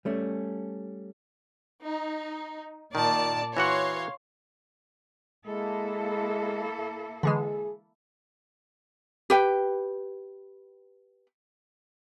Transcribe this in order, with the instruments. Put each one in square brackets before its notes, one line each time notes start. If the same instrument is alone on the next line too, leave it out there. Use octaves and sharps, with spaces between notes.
[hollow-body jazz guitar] G3 A3 C#4
[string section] D#4
[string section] A#2 D5 A5 [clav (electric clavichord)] D#3
[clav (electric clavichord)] E3 F#4 F#5 [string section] C#5 F5 C6
[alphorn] G#3 [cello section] A#3 E4 A4
[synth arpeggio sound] D3 E3 G#3 [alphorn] G#4
[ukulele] G4 B4 G5